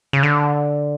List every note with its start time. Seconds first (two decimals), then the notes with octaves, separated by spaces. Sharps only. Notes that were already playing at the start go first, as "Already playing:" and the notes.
0.13 C#3
0.23 D3